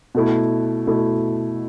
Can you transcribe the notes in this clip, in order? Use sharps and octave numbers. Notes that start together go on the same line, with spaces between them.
B2 A3 E4
B2 A3 E4